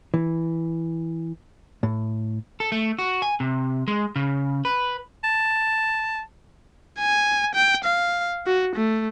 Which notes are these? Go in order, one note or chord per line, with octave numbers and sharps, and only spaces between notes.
E3
A2
A4
A3
F#4
G#5
C3
G#3
C#3
B4
A5
G#5
G5
F5
F#4
A3